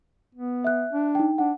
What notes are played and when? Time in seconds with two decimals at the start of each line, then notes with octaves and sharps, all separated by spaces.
0.35 B3
0.64 E5 F#6
0.93 D4
1.15 D#4 G5
1.38 D4 F#5